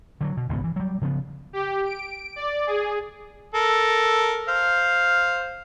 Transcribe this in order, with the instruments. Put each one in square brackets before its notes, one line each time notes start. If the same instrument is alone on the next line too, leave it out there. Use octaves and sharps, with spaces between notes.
[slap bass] D3 E3 F#3
B2
G#1 C#2 A#2 B3
E3
F#3 G3
C#3 F3 G#3 B3
[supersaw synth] G4
D7
D5
G#4
[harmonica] A4 A#4
C5 F5